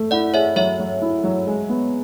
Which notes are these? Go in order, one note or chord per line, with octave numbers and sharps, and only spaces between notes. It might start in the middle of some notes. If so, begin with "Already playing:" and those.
Already playing: A3
E4 D5 F#5
G#4 C#5 E5
F#3 C#5 E5
F#3
E4
F#3
G#3
B3